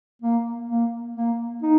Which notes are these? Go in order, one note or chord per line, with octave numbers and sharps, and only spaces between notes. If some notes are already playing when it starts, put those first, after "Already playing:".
A#3
A#3
A#3
D#4